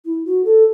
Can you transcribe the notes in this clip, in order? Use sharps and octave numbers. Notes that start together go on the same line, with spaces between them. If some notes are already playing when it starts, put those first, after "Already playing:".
E4
F#4
A4